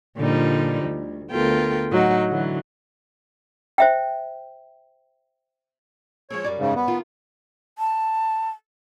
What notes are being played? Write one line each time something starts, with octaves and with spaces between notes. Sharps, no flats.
A#2 D3 F3 G3 D#4
D2
D2 B3 F4 A4 A#4 G5
A2 F#3 D#4 F#5
D3 E3 F#3
C5 E5 G5
F3 G#3 C4 C#5
F#2 G3 D5
G#2 C#3
B3
D#3 F4
A5